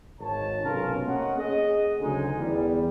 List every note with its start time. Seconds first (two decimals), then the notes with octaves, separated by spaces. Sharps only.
0.18 G#1 C#5 A5
0.63 B1 C3 C#4 F4 A#4
1.06 A#3 C#4 C#5 D#5 F#5
1.37 G#4 D#5
1.99 D2 C#3 F#3 G#3 D#4 G#5
2.37 E2 G3